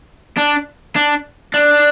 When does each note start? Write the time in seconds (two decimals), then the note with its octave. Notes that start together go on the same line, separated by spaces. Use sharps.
0.37 D4
0.96 D4
1.54 D4